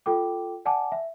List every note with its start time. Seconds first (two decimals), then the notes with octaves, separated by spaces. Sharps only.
0.06 F4 A4 G5 D6
0.65 D5 F#5 G#5 A5 D6
0.92 E5